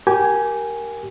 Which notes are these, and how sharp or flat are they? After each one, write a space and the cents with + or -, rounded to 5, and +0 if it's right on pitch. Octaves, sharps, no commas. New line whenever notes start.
G4 -20 A#4 +0 G#5 +0